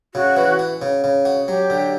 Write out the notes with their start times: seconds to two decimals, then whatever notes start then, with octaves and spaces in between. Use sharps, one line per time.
0.15 C#3 F#4
0.37 E3
0.59 F#4
0.82 C#3
1.04 C#3
1.25 F#4
1.48 F#3 G4
1.70 D3